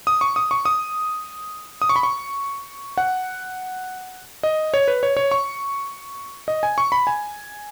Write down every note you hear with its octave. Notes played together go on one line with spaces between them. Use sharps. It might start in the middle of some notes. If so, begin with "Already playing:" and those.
D#6
C#6
D#6
C#6
D#6
D#6
C#6
B5
C#6
F#5
D#5
C#5
B4
C#5
C#5
C#6
D#5
G#5
C#6
B5
G#5